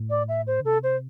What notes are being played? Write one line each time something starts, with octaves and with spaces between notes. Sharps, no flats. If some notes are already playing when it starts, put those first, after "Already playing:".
Already playing: A2
D5
E5
C5
D3
C3 A4
C5